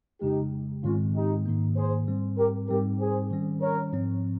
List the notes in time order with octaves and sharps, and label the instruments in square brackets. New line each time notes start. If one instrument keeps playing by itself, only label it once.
[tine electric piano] F2 C#3 G#3 [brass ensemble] D#4 G4
[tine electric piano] G#2 D#3 G#3 C4 [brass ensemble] C#4 F4
[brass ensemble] D#4 G4
[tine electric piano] G#2 D#3 A#3
[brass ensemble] G#4 C5
[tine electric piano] G#2 G3 C4
[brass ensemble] G4 A#4
[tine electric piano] G#2 G3 C4 D#4 [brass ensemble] G4 A#4
[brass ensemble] G#4 C5
[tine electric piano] D#3 G3 C#4
[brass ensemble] A#4 C#5
[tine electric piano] G#2 F3 C4